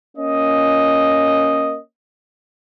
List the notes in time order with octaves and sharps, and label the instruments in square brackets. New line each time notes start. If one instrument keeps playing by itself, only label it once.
[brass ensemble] A#3 C#4 D#5